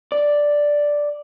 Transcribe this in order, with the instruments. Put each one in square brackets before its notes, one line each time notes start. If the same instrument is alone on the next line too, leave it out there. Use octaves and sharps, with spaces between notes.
[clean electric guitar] D5